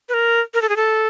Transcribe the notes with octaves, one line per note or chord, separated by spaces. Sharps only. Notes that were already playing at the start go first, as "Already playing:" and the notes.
B4
A#4
A#4
A4
G#4
A4